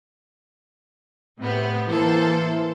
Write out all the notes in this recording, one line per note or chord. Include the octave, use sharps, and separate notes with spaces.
A2 C3 B3
E3 A#3 A4 C5